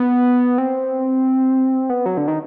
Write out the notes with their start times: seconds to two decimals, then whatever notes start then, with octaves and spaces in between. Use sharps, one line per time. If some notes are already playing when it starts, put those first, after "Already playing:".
Already playing: B3
0.58 C4
1.90 B3
2.06 F#3
2.17 D3
2.28 D#3